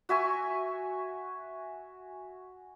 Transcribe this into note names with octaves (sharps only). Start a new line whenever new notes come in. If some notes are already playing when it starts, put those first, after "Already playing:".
F#4 E5 G#5 C#6